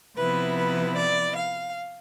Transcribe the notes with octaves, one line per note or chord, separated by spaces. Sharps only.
C3 F3 B3 E4 B4
B4
D5
F5